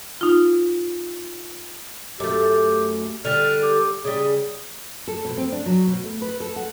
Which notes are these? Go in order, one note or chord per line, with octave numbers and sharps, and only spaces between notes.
D#4 F4
F#2 A3 G4
D3 G3 F6
G4
C#3 G3 G#4
A4
B2
C4
D4
F#3
B2
A3
B4
A4
F#5